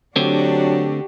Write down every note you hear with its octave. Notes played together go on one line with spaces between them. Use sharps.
D2 D3 F#3 C4 D4 F#4 G4